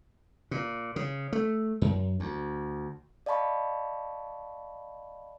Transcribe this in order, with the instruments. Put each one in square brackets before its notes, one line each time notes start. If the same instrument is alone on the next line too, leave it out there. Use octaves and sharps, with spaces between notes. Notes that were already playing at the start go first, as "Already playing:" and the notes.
[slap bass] A#2
C#3
A3
F#2
D2
[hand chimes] D5 D#5 F5 A5 B5 C#6